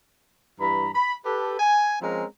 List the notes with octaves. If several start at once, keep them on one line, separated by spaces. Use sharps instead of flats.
G2 E3 A#5 B5
B5
G4 A4 B4
G#5
F3 G#3 C4 C#4 A#4 A#5